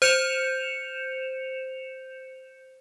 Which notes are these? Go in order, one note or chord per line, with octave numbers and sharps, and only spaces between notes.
C5 G6 C#7 E7 F7